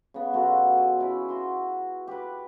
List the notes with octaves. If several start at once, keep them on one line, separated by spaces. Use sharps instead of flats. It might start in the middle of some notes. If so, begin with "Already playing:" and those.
C#3 B3
B2 F#3 A3 F4
G#5
C#4 E4
F#4 C6
G4 B4